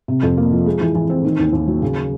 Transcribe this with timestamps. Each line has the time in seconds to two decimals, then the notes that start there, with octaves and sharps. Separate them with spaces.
0.08 C3
0.23 F2
0.37 A#3
0.52 F3
0.66 G#3
0.81 E3
0.95 E3
1.10 C4
1.24 D#3
1.39 D#2
1.53 D#2
1.68 F#3
1.82 C#3